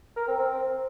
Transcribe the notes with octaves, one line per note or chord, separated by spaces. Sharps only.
A#4
C4
C4